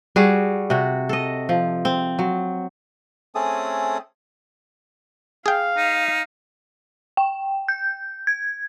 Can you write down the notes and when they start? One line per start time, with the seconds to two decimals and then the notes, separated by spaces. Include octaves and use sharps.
0.16 G3 F#4 G#4
0.70 C3 F#4
1.09 A4 D#5
1.49 F3
1.85 C4
2.19 F#3
3.35 A3 C4 C#4 G#4 A4 D#6
5.46 G#4 F5 G5
5.77 D#4
7.17 G5
7.68 G6
8.27 G#6